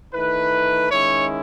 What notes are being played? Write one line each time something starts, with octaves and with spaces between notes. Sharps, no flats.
D#3 A3 E4 B4
D#3 G#3 C#4 E4 C#5